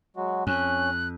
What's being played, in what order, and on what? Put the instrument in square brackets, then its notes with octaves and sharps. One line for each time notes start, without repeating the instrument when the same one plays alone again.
[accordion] F#3 G#3 F#4
[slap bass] F2 [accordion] C#4 [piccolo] F#6